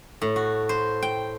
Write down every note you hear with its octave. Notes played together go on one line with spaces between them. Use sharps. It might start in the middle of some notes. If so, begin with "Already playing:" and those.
A2
F#4
C5
G5